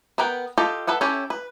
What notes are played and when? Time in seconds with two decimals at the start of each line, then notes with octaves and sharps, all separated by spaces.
0.18 B3 A#4 B4 G5
0.58 F4 G4 A4 D#5
0.87 A4 B4 E5 F#5
1.01 C#4 E4 G4 A4
1.30 B4